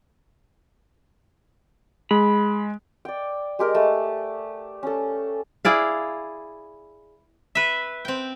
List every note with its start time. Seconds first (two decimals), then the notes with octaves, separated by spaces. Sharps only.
2.11 G#3 B5
3.05 D5 G5
3.59 G#3 G4 A#4
3.75 A3
4.83 C#4 A4
5.65 E4 G#4 D5 F5
7.55 B4 E5
8.05 C4 G5